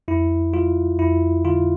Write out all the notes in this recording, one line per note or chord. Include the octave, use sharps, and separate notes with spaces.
F2 E4
G3 F4
F2 E4
D3 F4